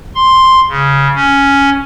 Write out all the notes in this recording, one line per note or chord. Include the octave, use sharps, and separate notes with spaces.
C6
C#3
C#4